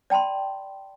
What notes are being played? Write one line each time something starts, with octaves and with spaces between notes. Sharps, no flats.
D5 G5 A5 B5 C6